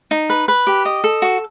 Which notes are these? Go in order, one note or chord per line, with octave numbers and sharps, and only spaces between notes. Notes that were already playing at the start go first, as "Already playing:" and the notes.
D#4
B4
B4
G4
D#5
A4
F#4